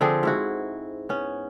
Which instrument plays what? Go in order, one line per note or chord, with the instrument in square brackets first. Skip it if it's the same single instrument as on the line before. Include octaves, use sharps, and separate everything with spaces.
[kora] D3 F3 C4 G#4
G#2 E4 F#4
B3 C#4